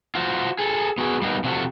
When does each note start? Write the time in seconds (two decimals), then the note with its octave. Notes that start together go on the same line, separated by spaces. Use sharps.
0.15 F4 F#4 C5
0.59 G#4 A4
0.98 B3 F#4 G#4
1.22 G3 A#3 B3 D#4
1.44 C3 F3 A3 F#4 G4 A4